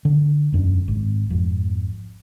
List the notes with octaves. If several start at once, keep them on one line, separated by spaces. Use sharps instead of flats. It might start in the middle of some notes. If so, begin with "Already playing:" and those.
D3
E1 F#2 D4
G#1
G#1 F2